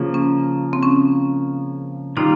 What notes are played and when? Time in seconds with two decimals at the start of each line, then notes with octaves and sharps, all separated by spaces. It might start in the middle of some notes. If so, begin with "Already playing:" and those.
Already playing: C#3 F3 A#3
0.14 C#4
0.73 C4
0.83 C#4
2.17 D#3 G3 A#3 D#4 F4